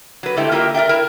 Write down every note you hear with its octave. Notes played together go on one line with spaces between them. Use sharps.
F#3 B4
D3 G#3 A3 E4 G4 G5
A#3 E4 F4 G4 A#4 G5
A#4 D5 E5 G5
E4 A#4